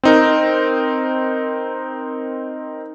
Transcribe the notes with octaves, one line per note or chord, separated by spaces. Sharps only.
C4 D#4 A#4